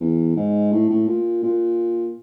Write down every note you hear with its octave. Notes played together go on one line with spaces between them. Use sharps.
E2
G#2
A2
A2
A#2
A#2